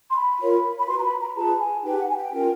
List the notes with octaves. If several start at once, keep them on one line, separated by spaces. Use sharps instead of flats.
C6
B5
F4 A#4 C#5
B5
F#4 B4 C6
A#5
B5
A#5
F4 G#4 B4 A5
G#5
D#4 G4 B4 G5
F#5
G#5
G5
C#4 F4 A#4